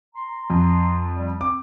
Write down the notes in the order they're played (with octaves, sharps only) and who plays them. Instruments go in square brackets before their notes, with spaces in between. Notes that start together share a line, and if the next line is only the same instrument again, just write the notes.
[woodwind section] A#5 C6
[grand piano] F2
[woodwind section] G3
[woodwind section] C4 [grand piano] D6